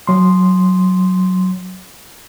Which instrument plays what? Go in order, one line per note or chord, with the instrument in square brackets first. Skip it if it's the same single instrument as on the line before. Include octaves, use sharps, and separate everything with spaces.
[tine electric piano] F#3 C6